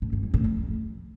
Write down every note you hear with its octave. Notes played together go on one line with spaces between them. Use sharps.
A2
G2
E2
A2
F2